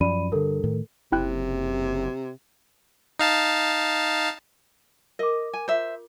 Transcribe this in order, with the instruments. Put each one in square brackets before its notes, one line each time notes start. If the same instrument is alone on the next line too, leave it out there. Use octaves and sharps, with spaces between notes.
[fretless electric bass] F#2 F3 C#4 [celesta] D5 B5 D#7
[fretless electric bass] G2 D3 [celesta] A4 A#4
[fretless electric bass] A2 D#3
[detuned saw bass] F#1 [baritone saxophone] C3 [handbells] E4 G5 F#6
[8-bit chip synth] D#4 F5 A5
[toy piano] A#4 D6 [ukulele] D#5
[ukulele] G#5
[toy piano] F4 [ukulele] C5 E5